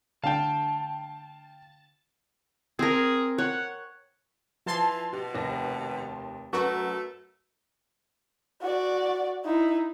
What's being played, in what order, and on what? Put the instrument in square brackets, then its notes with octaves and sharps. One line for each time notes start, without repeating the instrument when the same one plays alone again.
[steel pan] D3 D4 [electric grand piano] F5 G5 [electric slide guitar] A5
[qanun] C4 A#4 [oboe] G#4
[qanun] C#5 [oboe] F#5
[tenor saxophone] E3 [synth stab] F3 A5 C6
[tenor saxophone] B2 [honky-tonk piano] G4
[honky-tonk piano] F1 D#2 A#6
[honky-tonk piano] F#2 A#4 B4 [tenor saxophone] A3 [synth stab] F#4
[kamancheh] F#4 D5
D#4 E4